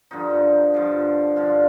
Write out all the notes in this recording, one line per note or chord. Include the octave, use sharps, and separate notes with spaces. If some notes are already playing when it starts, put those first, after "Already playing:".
G2 D3 F3 D#4
G2 D3 F3
G2 D3 F3 F4